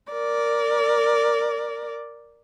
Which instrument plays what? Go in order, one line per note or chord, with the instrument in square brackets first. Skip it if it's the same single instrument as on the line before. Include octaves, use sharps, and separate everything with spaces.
[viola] A#4 D5